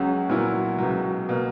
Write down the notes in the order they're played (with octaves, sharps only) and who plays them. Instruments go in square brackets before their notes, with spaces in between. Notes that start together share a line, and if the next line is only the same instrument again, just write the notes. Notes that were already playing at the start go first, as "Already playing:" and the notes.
Already playing: [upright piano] C#2 C#3 F#3 C#4 F#4
A#2 F#3 B3 E4 A#4
C#2 B2 F#3
B2 A#3